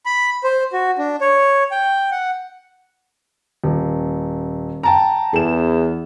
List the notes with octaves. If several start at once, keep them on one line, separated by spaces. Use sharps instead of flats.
B5
C5
F#4
D4
C#5
G5
F#5
D#1
G5 A5 A#5
E2 G#4 E7